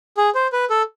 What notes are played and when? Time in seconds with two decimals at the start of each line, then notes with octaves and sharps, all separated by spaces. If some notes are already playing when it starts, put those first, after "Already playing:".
0.17 G#4
0.35 C5
0.53 B4
0.70 A4